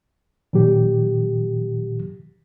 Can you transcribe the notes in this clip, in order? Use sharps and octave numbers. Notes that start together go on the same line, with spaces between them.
A#2 D#3 F#3 G4